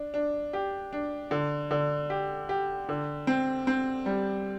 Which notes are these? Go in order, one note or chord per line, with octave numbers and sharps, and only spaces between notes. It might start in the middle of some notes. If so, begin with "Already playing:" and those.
Already playing: D4
D4
G4
D4
D3
D3
G4
G4
D3
C4
C4
G3